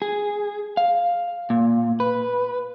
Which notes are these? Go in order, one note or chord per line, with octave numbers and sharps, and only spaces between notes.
G#4
F5
A#2
B4